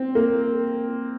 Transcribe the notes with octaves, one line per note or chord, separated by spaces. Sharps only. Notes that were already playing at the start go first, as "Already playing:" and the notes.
Already playing: C4
A#3